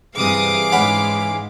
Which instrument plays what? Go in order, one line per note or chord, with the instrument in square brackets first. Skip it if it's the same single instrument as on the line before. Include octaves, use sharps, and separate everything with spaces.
[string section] G2 C3 D#6 [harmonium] E3 [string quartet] G#4 F5 D6
[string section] G#2 G#3 [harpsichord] C#4 F#5 B5